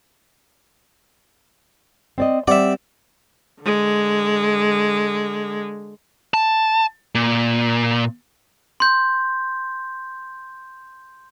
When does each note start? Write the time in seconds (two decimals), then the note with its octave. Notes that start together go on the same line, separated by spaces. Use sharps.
2.18 C4 D5 D#5
2.48 G3 C4 D5 E5 F#5
3.63 D3 G#3
6.34 A5
7.15 A#2
8.80 C6 G6